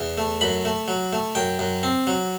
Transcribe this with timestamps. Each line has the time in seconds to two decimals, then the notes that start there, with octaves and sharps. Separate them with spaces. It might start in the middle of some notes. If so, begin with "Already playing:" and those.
Already playing: E2
0.18 A3
0.41 F#2 B5
0.65 A3
0.88 F#3
1.13 A3
1.35 F#2 G5
1.59 F#2
1.83 C4
2.07 F#3